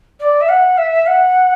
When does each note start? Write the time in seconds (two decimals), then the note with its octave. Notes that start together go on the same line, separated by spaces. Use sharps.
0.19 D5
0.40 E5
0.48 F#5
0.77 E5
1.06 F#5